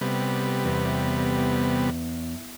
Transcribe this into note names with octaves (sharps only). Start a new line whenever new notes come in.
C3 G3 B3
E2